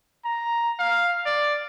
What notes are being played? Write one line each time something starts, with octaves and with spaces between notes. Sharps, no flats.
A#5
F5
D5